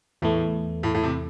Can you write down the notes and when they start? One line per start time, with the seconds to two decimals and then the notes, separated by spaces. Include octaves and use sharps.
0.22 E2 A2 E3 A3
0.83 A2
0.95 A2
1.04 C3